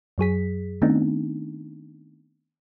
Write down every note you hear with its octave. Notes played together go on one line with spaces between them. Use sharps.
F#2 F#3 G#4 B6
D#3 A3 B3 C4 D4 D#4